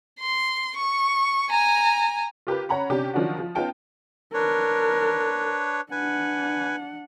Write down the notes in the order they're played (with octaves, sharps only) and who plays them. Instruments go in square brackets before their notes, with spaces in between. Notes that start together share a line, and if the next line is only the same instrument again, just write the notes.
[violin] C6
C#6
G#5 A#5
[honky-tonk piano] F4 G4 A#4 B4
C#4 C#5 F#5 A#5 B5
C3 C#4 D4 G4
D#3 F3 F#3 D4 F#4
F3
B3 C#4 D#4 F4 G5 A5
[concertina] D4 B4 C#5 [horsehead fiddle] A#4
[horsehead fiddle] D4 F#5 [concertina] B4 G#5